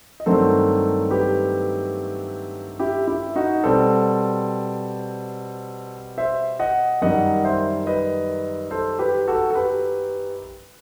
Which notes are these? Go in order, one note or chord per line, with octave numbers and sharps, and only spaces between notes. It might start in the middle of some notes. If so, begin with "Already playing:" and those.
D#5
G2 D#3 F#3 A3 C4 A4 C5
G4 B4
E4 G4
E4
D#4 F#4
B2 G3 C4 A4 C5
C5 E5
D#5 F#5
F#2 D#3 G3 D#5 F#5
C5 E5
B4 D#5
A4 C5
G4 B4
F#4 A4
A4
G4 B4